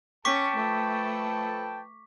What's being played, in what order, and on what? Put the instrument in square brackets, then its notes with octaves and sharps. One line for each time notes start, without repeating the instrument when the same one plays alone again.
[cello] C#4 [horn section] G5 A5 [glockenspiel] C#6 D6 B6
[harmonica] F3 A4 B4 [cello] A3